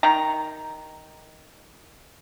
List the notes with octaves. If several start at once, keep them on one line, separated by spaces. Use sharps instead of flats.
D#3 A#5